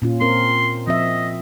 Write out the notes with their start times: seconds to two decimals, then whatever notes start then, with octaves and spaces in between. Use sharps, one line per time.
0.02 A#2 C#4 F4
0.21 C4 A#4 C6
0.87 F3 C4 D#5 E5